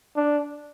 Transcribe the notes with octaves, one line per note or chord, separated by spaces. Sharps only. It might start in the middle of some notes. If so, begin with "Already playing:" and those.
D4